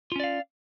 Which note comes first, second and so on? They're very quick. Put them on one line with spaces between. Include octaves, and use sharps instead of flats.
F4 C#4 D5 F5